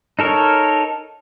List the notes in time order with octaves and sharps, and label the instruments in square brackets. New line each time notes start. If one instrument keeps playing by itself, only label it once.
[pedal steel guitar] D#4 A4 A#4 C#5